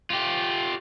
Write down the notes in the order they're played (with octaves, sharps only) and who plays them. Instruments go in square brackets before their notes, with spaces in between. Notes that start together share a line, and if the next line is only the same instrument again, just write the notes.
[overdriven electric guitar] F4 G4